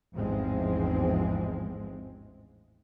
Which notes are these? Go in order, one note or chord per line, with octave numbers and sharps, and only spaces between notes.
A1 E2 G#2 F3 G#3 C4